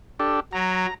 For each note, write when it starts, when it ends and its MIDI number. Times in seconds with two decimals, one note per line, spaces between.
0.20 0.40 62
0.20 0.40 67
0.20 0.40 69
0.53 0.86 54
0.53 0.94 82